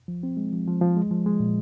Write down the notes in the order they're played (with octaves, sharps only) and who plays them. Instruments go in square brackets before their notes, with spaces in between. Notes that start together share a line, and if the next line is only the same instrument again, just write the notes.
[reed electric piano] F3
C4
G#3
F3
F3
F3
G#3
F3
G#3
A#2